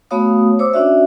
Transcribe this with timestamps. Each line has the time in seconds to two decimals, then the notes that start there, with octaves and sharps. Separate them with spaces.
0.11 A3 B3 F#4 C#5 F5 D#6
0.59 C5 C#5 D6 E6
0.73 C#4 D4 F#4 D5 E5